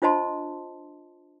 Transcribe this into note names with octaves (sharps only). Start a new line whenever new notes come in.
D4 F4 C5 D#5 A5 C6